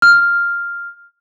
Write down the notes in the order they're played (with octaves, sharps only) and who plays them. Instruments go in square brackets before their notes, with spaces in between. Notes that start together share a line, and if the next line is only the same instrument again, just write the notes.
[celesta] F6